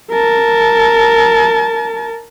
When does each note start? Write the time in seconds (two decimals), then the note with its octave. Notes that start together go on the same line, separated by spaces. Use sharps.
0.11 A#4 A5